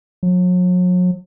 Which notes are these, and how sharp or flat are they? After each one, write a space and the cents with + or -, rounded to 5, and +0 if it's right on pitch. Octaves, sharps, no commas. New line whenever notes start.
F#3 -40